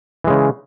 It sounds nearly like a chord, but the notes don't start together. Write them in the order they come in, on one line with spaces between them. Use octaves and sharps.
E3 G#3 C#3